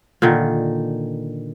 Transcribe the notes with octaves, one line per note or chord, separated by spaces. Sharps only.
A#2 D3 D#3